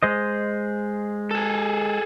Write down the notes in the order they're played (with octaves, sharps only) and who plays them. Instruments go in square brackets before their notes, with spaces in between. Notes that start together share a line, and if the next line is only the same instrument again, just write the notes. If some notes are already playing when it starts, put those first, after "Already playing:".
[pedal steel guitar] G#3 C5 D#5
[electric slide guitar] G#4 A4